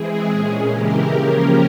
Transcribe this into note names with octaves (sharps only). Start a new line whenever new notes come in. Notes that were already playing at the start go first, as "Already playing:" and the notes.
Already playing: E3 G#3 C4 E4 G#4
A#2 G#3 C#4
C#3 E3 G#3 E4 G4 A#4
C#3 F3 A#3 C#4